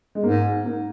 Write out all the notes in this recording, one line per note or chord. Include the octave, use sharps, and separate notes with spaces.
G#3
G#2 A#3
A#3